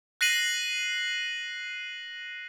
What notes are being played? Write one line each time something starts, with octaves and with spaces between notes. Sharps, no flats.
F#6 A#6 C7 D#7 F#7